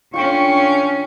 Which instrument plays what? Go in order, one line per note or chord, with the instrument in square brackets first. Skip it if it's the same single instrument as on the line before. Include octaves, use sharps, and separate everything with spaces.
[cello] D3 C#4 [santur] F4 G5 [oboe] C#6